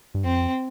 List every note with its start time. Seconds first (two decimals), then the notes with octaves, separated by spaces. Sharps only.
0.15 G2
0.24 F2 C4